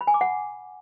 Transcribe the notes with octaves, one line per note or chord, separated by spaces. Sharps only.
B5
G#5
D6
F#5